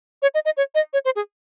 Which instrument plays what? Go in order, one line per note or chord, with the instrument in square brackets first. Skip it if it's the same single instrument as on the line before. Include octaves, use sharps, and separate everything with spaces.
[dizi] C#5
D#5
D#5
C#5
D#5
C#5
C5
G#4